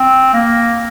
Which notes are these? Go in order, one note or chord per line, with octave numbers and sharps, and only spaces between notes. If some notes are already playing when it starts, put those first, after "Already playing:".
Already playing: C4
A#3